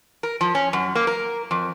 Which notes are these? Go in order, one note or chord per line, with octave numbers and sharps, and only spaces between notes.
A#4
F3
C#4
F#2
A#3
A#4
F2